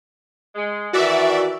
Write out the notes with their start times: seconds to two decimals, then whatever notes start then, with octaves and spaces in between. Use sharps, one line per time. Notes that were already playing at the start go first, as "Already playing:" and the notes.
0.55 G#3
0.93 D#3 E3 F#4 D5 E5